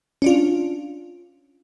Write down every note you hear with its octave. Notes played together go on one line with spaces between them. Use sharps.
C#4 D4 F4